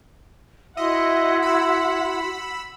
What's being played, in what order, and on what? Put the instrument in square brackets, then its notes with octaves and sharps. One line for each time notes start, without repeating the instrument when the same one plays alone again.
[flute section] E4 F#4 C6 [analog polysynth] D#5 [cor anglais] E5 [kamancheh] F#5
[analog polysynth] B5 E6